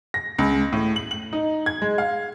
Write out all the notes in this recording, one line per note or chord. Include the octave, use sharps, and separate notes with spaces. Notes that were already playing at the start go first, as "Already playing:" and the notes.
A#6
C#2
A2
F#7
F#7
D#4
G#6
G#3
F5